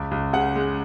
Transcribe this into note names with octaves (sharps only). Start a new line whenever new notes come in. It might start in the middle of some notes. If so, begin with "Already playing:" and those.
Already playing: C#2
C#2
C#3 F#5
G#3